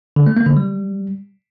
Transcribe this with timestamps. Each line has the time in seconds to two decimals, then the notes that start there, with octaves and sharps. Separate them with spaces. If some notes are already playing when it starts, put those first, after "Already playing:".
0.16 D3
0.26 A3
0.37 A#3
0.47 D3
0.57 G3